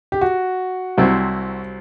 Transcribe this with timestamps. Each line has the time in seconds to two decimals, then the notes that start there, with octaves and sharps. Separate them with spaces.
0.12 G4
0.21 F#4
0.97 C2 C3 F#3 C4 E4